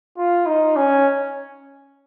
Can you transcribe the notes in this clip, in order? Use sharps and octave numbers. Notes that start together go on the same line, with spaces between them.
F4
D#4
C#4